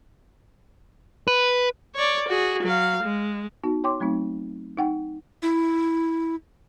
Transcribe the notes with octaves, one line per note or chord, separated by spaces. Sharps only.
B4
C#5 D5
F#4 G#4
F#3 F5
G#3
B3 D#4 F#4
C#5 G5 C6 D6
F#3 A3 C4 D#4
D#4 F#5 G5
E4